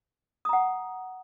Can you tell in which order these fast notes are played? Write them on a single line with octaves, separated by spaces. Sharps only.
D#6 A#5 F#5